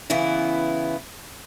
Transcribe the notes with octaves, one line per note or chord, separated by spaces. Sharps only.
C#3 E3 B3 E4